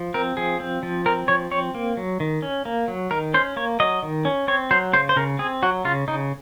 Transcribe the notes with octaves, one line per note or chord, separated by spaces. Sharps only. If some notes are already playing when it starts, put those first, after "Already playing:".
Already playing: F3
C4 A#4
F3 G#4
C4
F3
C4 A#4
F3 C#5
C4 C#5
A#3
F#3
D#3
C#4
A#3
F#3
D#3 A#4
C#4 C5
A#3 C#5
F#3 D#5
D#3
C#4
C4 C#5
F#3 C5
C#3 C5
C5
C#3 A#4
C4 G#4
F#3 F#4
C#3 F4
C#3 D#4